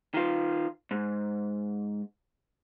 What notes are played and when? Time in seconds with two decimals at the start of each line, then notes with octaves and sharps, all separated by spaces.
0.14 D#3 F4
0.91 G#2